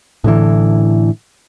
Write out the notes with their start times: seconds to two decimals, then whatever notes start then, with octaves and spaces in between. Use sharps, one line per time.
0.24 A2 D3 E3